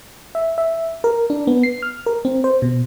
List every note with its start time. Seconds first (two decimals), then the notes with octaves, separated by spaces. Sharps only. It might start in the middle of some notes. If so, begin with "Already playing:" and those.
0.35 E5
0.58 E5
1.04 A#4
1.30 D4
1.47 B3
1.63 C7
1.82 F6
2.06 A#4
2.25 C4
2.44 C5
2.62 B2